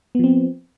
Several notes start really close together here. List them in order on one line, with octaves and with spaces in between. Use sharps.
B3 F3 C4